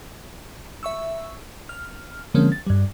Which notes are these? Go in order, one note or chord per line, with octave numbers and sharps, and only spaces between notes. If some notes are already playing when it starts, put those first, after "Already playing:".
E5 C#6 E6
F6
D3 F3 G#3 A#3 C4 C#4
A6
G2 G3